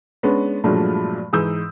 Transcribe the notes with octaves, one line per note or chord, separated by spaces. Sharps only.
G#3 B3 C#4 D4
G2 A#2 F3 F#3 G#3 A3
G#2 E3 D#6 E6 G6